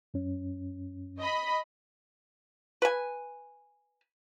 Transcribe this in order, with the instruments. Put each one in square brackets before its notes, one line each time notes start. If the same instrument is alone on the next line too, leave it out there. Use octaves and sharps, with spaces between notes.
[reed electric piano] F#2 C#4
[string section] D#5 B5
[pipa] B4 G#5